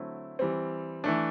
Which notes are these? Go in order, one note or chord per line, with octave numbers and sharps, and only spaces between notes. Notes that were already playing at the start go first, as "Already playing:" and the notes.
Already playing: D3 F#3 A3 C4 E4
E3 G3 C4
E3 A3 D4